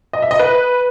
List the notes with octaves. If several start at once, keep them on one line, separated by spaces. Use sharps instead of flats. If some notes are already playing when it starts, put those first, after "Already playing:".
D#5
E5
D#5
B4